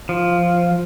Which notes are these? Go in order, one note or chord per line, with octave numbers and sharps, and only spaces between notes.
F3